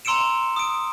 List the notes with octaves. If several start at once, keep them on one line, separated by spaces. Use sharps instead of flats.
A#5 C6 E6 C#7 D7 E7
D#6 D7